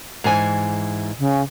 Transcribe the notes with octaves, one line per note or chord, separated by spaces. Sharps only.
G#2 E3 G#5
C#3